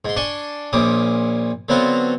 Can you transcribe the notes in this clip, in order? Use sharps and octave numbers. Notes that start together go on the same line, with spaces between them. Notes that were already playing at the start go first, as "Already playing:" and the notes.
G#2 C6
D4 D5 G#5 C6 C#6
A#1 A#2 C#4 D6 D#6
D3 F#3 B3 C4 F4 F#4